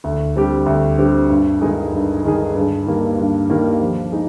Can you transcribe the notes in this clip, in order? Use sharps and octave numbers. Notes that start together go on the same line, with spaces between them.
D2
D3 G3 C4 G4
D2
D3 G3 C4 G4
G2
D#3 G#3 D#4 G#4
G2
D#3 G#3 D#4 G#4
G2
D#3 G3 A#3
G2
D#3 G3 A#3
F3
G#3 D#4